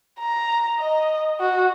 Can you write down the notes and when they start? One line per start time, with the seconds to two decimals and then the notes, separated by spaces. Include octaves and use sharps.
0.19 A#5
0.79 D#5
1.40 F#4